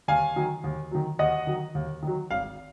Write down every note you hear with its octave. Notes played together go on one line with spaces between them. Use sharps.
D#2 F5 G#5
D#3 F#3
D#2
D#3 F#3
D#2 D#5 F#5
D#3 F#3
D#2
D#3 F#3
G#1 F5